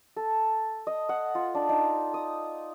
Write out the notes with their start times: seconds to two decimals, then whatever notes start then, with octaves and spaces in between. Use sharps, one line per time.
0.16 A4
0.87 D#5
1.09 F#5
1.35 F4
1.55 D4
1.69 D#4
2.14 D#6